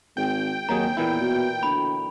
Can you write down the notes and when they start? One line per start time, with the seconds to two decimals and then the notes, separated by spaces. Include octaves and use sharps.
0.17 G#1 G5
0.69 D#2 D#3 F#3 G#4 A#5
0.97 E2 A#2 E3 E4
1.20 B2
1.63 D2 B5